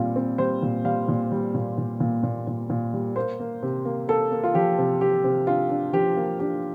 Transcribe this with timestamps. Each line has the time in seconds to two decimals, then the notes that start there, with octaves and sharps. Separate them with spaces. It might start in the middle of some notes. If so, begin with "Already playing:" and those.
Already playing: A#2 G3 C4 F4
0.16 C4
0.38 G3 C5
0.62 A#2
0.85 G3 F5
1.08 A#2
1.32 G3
1.55 A#2
1.78 A#2
2.00 A#2
2.23 A#2
2.47 A#2
2.70 A#2
2.93 G3
3.16 A#3 C5
3.40 A#3
3.63 C3
3.85 A#3
4.08 A#3 A4
4.32 A#3
4.43 F4
4.54 F3 G4
4.78 C3
5.01 C3 G4
5.24 C3
5.47 D4 F4
5.70 D4
5.93 F3 G4
6.16 A#3
6.39 D4 G4